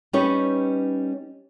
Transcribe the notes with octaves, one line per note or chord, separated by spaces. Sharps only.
G3 C#4 D#4 G4 B4 C#5